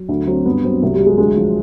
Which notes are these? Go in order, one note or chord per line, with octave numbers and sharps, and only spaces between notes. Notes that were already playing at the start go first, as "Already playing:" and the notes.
Already playing: F#3
D2
F#3 C4
G2 B3
F#3 C4
C2 F#3
G3
F#3
G#3
D2 G#3
F3